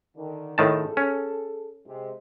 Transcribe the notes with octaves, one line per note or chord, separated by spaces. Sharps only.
D3 D#3
A2 D#3 G#4 A4 A5
C#4
C3 G#3